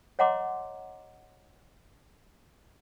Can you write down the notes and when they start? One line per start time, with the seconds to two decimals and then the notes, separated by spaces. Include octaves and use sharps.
0.19 C#5 D#5 F#5 A#5 C6 D6